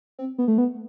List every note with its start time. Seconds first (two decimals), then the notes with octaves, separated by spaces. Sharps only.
0.19 C4
0.38 B3
0.48 A3
0.58 B3